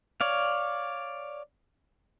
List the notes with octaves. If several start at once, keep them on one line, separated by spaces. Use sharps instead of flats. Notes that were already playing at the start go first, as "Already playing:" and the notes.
C#5 D5 F5